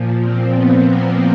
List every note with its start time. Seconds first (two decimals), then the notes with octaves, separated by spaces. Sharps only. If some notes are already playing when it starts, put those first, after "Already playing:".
Already playing: A#2 F3
0.24 C4
0.56 B3
0.88 A#3